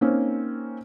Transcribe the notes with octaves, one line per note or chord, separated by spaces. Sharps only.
A#3 C4 C#4 D#4